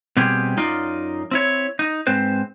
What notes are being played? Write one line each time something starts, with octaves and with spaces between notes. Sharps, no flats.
B2 G3 C4 G4 G#4
F#2 D#4 F4 D5
C4 E4 C#5
D#4
G#2 C4 B4 C5